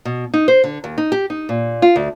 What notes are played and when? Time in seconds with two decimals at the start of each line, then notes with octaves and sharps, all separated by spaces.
0.05 B2
0.34 D#4
0.48 C5
0.64 D3
0.84 D#2
0.98 D#4
1.12 G4
1.30 D#4
1.49 A#2
1.82 F4
1.96 D2